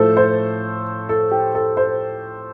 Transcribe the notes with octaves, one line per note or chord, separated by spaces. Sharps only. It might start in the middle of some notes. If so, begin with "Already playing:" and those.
Already playing: A2 F3 A3 A4 C5
C5
A4
G4
A4
C5